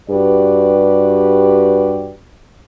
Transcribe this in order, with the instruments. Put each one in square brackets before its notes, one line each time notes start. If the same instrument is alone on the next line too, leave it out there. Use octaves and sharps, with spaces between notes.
[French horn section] G2 F#4 G4 B4 D5